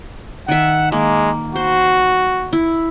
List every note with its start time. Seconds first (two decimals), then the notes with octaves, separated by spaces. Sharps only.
0.48 D#3 E5 F#5
0.92 G#3 A#3
1.56 F#4 C5
2.53 E4